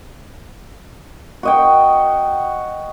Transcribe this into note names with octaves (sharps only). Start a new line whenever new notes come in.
F#4 D#5 G5